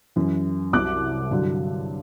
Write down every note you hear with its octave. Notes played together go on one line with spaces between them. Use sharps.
F#2 E3
C2 C3 F#3 D6 F#6
G2 D3 F#3